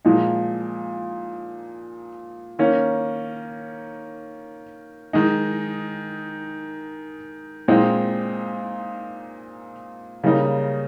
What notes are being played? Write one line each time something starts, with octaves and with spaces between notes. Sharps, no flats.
A#2 F3 G#3 D#4
D#3 A#3 C#4
D#3 G#3 D#4
A#2 G#3 C4 D#4
C#3 G3 A#3 D#4